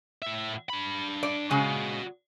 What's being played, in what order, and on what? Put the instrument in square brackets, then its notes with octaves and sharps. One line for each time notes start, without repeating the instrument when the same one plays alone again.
[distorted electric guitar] A2 E5
D4 B5
[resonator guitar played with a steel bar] D5
[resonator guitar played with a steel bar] C#3 G#3 [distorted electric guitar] F#4 D#5